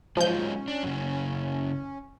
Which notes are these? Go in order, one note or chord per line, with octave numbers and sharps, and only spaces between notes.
F3 F#3 G#3 C#4 D#4 G6
D4
F#2 C#3